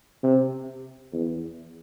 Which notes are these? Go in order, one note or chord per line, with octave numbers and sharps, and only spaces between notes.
C3
E2